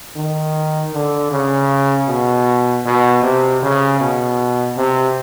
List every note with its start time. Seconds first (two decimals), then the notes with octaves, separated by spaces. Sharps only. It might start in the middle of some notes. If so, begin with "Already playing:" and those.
0.16 D#3
0.94 D3
1.32 C#3
2.08 B2
2.85 B2
3.23 C3
3.63 C#3
4.01 B2
4.78 C3